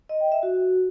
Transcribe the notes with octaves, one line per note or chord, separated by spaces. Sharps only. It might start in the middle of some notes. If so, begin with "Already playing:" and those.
D#5
G5
E5
F#4